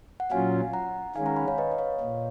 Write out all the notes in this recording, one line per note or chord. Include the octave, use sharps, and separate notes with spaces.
F#5
A#2 F#3 C#4 F4 F5 G#5
F#5 A#5
D#3 G#3 C#4 F5 G#5
F#5 A#5
G#5 B5
C#5 F5
B4 D#5
D#5
C#5 F5
A#2